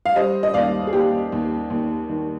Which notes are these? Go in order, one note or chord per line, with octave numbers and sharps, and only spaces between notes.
F5
G3 C5 D#5
D#5
D#2 D5 F5
G#4
D#2 G4
D#2
D#2
D#3